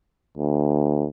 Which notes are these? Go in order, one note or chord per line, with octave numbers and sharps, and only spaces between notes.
D2